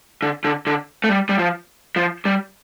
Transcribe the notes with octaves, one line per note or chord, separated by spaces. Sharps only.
D3
D3
D3
A3
G3
G3
F3
F3
G3